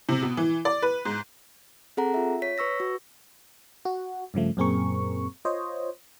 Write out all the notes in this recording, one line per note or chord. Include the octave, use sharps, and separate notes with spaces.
C3
B2
E3
D5
B4
G#2
C4 G#4 A4 F#5 A#5
F4 E5
C#5 B6
B4 C#6 E6 A#6
F#4
F#4
G2 C#3 F3 A3
F#2 A#2 C4 G#4 A#4 C#6
F4 C5 C#5 D#5